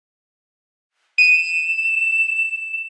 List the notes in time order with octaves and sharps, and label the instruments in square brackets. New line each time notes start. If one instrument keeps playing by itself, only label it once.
[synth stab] D#7 [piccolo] E7